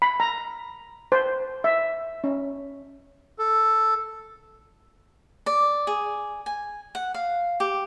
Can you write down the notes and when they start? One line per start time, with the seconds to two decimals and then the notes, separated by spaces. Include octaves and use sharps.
0.02 B5
0.20 A#5
1.12 C5
1.64 E5
2.24 C#4
3.39 A4
5.46 D5
5.87 G#4
6.46 G#5
6.95 F#5
7.14 F5
7.60 G4